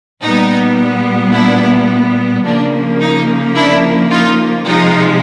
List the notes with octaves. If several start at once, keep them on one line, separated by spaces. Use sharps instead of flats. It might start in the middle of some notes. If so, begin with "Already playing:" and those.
A#2 G3 B3 D#4
D4 E4
C#3 F3 A#3 D4
D#4
D4 E4
D#4 F4
C3 F3 G#3 D#4 F4